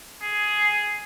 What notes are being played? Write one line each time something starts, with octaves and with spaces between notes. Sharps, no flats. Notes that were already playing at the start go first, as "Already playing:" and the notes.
G#4